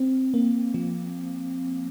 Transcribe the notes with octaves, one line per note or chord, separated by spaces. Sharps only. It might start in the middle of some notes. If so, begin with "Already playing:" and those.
Already playing: C4
A#3
F3